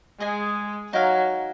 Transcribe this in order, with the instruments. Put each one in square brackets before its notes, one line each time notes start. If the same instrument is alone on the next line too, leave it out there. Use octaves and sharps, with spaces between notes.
[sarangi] G#3 [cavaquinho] G#4 D#5 G#5
[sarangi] F#3 [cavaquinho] D#4 A#4 F5 G#5